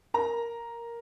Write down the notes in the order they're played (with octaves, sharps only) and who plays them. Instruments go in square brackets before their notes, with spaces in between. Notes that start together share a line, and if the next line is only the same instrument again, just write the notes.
[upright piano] A#4 A#5